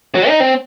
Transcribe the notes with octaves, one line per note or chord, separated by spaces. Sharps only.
F#3
D#4
C4